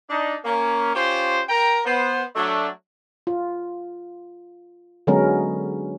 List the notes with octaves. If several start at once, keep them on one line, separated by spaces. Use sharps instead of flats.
D4 D#4
A#3 C#4
C#4 F4 G4 C5
A#4 G5 A#5
B3 C5
F#3 A3 D4
F4
D3 F#3 G#3 B3 C#4 A#4